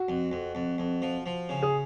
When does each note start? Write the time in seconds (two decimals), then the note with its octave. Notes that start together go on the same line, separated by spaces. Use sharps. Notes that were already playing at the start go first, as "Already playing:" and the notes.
Already playing: F#4
0.08 F2
0.32 F2
0.55 F2
0.78 F2
1.02 F3
1.26 F3
1.49 C#3
1.63 G#4